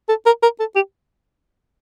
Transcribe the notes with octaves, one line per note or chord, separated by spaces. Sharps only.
A4
A#4
A#4
A4
G4